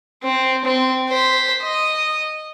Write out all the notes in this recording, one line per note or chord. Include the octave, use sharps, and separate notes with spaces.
C4
C4
C5 B6
D#5